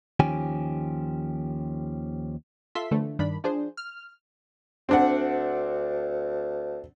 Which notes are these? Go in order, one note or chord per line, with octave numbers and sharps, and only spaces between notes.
D#2 D#3 F3 C#4 G4 G#5
F4 A4 E5 C6 B6
D3 E3 F3 A3
G2 D#3 D4 B5
F3 D4 G#4 C5
F6
D2 C4 D4 F#5